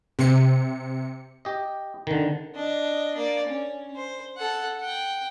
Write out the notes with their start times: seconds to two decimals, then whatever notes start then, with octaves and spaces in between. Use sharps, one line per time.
0.19 C3 C#7
1.45 G4 D#5
2.07 D3 D#3
2.55 D4 D#5
3.16 A#3 D5
3.47 C#4
3.96 C5
4.38 A4 F#5
4.79 F#5 G5